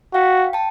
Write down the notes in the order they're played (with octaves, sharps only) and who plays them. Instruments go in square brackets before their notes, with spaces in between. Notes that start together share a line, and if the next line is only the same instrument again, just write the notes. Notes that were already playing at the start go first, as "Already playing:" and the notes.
[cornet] F#4 [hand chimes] F5 G5
[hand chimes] G5 A5